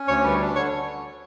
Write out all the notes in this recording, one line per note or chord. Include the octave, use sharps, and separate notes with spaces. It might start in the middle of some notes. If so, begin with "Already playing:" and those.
Already playing: C#4
D2 C#5
G3 B4
D4
D3 C#5